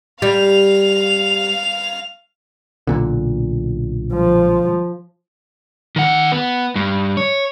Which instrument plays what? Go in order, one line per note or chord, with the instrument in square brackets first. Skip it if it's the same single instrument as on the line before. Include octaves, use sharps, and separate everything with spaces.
[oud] G3 [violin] F5 F7
[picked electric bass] B1 A#2 D3
[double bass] F3
[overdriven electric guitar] D#3 F#5
B3
G2
C#5